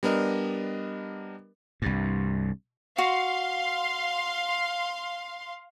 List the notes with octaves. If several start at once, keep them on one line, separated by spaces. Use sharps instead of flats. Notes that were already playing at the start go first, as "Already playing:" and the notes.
G3 B3 D4 A#4 D#5
C2 G2
F#4 F5 C6